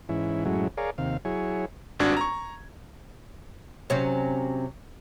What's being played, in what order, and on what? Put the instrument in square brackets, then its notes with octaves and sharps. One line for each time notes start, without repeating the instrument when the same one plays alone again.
[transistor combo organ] G#2 E3 C#4 E4
F#2 A2 F#3 G#3 C#4 E4
G#4 A#4 C#5 D5 F5
D#2 C3 F5
F#3 E4 G#4 C#5
[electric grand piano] G#1 G2 D4 F#4 G#6
A#5 C#6
[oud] C3 F#3 C#4